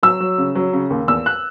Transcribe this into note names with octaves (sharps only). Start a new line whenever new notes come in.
F#3 E6
F#3
C#3
F#3
C#3
D#2
E2 E6
F#6